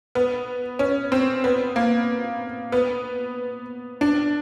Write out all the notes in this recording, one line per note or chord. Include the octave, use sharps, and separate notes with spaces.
B3
C#4
C4
B3
A#3
B3
D4